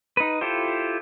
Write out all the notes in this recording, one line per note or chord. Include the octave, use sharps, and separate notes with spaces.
D#4 B4
E4 F4 G4 A4 C5